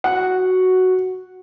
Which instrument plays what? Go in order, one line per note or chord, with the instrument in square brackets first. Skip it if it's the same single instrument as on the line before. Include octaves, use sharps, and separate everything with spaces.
[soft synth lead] F#4 [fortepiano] F#5